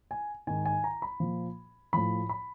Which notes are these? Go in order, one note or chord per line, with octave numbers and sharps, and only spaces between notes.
G#5
G#2 D#3 G#5
G#5
A#5
B5
A#2 F3
A2 F3 B5
B5